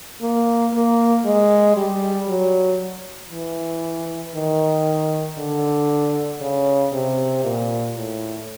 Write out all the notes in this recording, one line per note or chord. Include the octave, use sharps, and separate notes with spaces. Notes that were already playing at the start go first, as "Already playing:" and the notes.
A#3
A#3
G#3
G3
F#3
E3
D#3
D3
C#3
C3
A#2
A2